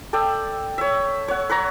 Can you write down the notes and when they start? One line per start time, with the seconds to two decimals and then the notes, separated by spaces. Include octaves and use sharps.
0.13 A4 D5 E5 G5
0.78 C#5 E5
1.28 C#5 F#5
1.50 B4 C#5 A#5